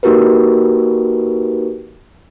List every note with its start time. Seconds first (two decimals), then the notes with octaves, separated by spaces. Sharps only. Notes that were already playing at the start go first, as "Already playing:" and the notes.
0.03 A#3 D#4 F#4 G4 A#4 B4